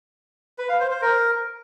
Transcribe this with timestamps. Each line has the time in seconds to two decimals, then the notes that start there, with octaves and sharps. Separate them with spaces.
0.58 B4
0.69 F5
0.80 C5
0.91 C5
1.02 A#4